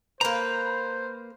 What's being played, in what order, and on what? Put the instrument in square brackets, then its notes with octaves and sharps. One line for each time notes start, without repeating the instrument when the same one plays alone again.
[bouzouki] A#3 B4 [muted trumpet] C5 [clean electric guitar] A#5